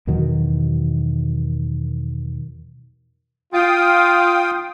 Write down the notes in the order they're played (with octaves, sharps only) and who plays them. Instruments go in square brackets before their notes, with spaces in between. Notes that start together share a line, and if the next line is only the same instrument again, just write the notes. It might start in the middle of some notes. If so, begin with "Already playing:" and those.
[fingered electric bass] E2 B2 D#3 F#3
[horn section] F4 [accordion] F5 G5 D#6